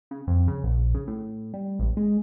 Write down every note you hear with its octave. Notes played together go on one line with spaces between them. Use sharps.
C#3
F2
C#3
A#1
C#3
A2
G3
A1
G#3